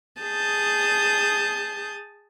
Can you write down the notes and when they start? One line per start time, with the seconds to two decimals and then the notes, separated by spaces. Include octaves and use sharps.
0.21 G#4 A5 D#6 G6